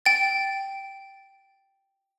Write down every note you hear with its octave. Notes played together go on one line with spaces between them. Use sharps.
G5 A6